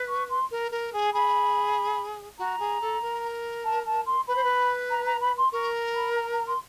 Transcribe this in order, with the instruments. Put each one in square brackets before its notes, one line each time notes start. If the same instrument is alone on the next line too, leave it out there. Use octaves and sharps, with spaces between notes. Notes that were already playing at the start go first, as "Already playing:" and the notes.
Already playing: [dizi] B4
[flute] C#6
C6
[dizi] A#4
A#4
G#4
[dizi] G#4 [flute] B5
[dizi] F#4 [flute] A#5
[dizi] G#4
A4
A#4
[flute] A5
A5
C6
[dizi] B4 [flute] B5
[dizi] C5
B4
[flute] A#5
A#5
B5
C6
[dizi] A#4 [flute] C#6
[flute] B5
A#5
A#5
C6